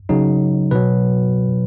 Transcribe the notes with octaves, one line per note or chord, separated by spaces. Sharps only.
C#3 F#3 D#4
B2 F#3 B4